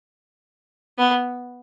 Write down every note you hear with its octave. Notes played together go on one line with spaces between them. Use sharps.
B3